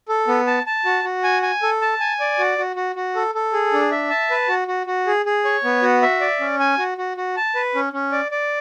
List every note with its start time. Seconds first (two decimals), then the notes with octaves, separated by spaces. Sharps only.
0.09 A4
0.28 B3
0.47 A5
0.66 A5
0.85 F#4
1.04 F#4
1.24 G#5
1.43 G#5
1.63 A4
1.81 A5
2.00 G#5
2.20 D5
2.39 F#4
2.58 F#4
2.76 F#4
2.96 F#4
3.15 A4
3.35 A4
3.53 G#4
3.73 D4
3.91 E5
4.10 A5
4.31 B4
4.48 F#4
4.68 F#4
4.87 F#4
5.07 G#4
5.26 G#4
5.45 C#5
5.64 B3
5.82 F#4
6.02 E5
6.21 D5
6.40 C#4
6.60 G#5
6.78 F#4
6.98 F#4
7.17 F#4
7.37 A5
7.55 B4
7.75 C#4
7.93 C#4
8.12 D5
8.32 D5